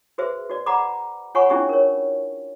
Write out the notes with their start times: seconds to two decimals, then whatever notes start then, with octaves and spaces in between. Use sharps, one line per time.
0.18 F#4 G#4 B4 C5 E5
0.50 F#4 D5
0.66 D5 F#5 A#5 B5 D6
1.35 F4 C#5 F#5 G#5 B5 C#6
1.50 C#4 D4 E4 F4 G4 G#4
1.69 A#4 C#5